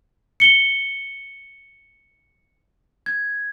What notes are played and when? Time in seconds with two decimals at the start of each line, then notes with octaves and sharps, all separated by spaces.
0.40 C#7 G7
3.06 G#6